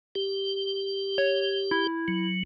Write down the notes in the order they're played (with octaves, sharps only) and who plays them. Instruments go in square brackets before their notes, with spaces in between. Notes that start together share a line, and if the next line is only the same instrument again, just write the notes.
[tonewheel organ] G4
[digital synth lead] C#5
E4
[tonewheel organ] F#3